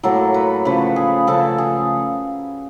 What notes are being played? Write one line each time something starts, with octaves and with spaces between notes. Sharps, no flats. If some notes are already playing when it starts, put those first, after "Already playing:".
A2 F#3 A#3 A4
B4
C#3 F3 A3 B4
G#4
C#3 F3 A3 A4
G#4